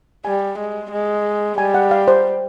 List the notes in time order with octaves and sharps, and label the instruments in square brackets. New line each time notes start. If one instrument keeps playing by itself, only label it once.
[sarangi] G3 [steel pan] G#5
[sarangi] G#3
G#3
[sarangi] G3 [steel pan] G#5
[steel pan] F#5
F5
C5